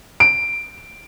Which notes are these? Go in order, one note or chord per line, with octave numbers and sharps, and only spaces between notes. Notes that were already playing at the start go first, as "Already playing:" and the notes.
D7